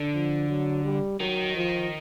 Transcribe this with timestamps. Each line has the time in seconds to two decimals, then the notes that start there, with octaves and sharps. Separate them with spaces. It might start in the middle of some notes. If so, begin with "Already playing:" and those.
Already playing: D3
0.14 F3
0.49 F#3
0.84 G3
1.20 D#3 F#3
1.56 F3